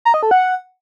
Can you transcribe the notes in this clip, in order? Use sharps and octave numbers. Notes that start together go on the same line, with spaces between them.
A#5
D#5
A4
F#5